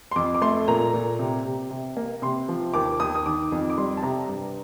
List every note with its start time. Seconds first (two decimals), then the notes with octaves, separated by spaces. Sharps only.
0.11 C6
0.16 F2 D6
0.35 D6
0.42 A3 C6
0.68 A#2 A#5
0.94 A#2
1.19 C3
1.45 C3
1.71 C3
1.97 A#3
2.22 C3 C6
2.49 F3
2.74 D#2 D6
3.00 D#2 D#6
3.15 D#6
3.26 D#3 D6
3.52 F2
3.70 D6
3.77 G3 C6
3.97 A5
4.03 C3 A#5
4.28 G2